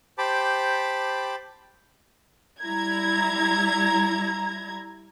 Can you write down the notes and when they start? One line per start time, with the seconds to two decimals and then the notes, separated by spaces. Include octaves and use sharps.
0.18 G4 C5 A5 B5 D6
2.62 G3 E4 A#5 G#6